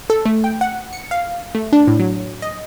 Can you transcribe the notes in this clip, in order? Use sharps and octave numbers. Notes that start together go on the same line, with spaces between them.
A4
A3
G5
F#5
C#7
F5
A3
D4
A2
F#3
D#5